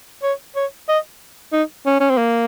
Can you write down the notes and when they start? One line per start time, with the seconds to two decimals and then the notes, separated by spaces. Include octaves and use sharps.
0.23 C#5
0.56 C#5
0.88 D#5
1.53 D#4
1.86 C#4
2.00 C#4
2.10 C4
2.18 A#3